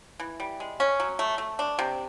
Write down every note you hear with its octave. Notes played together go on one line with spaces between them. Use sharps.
E3
G3
G#3
C#4
F#3
A3
A3
D4
C3